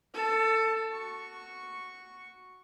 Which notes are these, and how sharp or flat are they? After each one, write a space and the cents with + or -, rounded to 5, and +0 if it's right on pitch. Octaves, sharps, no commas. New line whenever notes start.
A4 +20 A5 +0
F#4 +0 C#6 +0